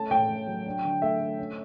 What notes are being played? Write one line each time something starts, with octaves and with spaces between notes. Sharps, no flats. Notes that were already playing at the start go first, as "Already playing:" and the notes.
Already playing: A3 C#4 A5
A2 G5
A2
F#3
D4
D3
A3 E5
A3
C#4